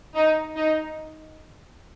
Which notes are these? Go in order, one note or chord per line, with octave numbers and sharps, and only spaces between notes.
D#4
D#4